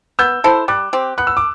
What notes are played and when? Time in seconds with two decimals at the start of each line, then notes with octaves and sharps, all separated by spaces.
0.19 B3 E6 G6
0.44 E4 A4 C5
0.68 G3 D6 F#6
0.93 C4 G4
1.18 B3 F#6
1.27 E6
1.37 D6